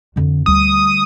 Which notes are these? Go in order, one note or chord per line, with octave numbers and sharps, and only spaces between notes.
F2 D3
D2 G3 D#6